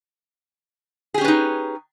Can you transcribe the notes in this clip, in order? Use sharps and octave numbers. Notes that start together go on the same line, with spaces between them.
C#4 D#4 G4 G#4 B4